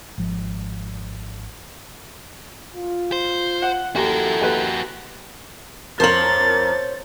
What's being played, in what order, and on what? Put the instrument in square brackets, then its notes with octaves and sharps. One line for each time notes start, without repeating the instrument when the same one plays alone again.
[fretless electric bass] G#1 F3
[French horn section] F4
[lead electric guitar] C5
[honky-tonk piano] F#5
[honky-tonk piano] D#2 [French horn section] E4 G4 A4 [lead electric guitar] F#4 A#4
[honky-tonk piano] D#2 B4
[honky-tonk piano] F2 A#4 F#7 [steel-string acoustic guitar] C5 C#5 [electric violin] A6